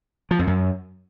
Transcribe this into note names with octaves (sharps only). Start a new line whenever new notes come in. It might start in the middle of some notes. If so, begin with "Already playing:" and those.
F3
F2
F#2